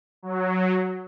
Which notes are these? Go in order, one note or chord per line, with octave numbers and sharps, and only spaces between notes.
F#3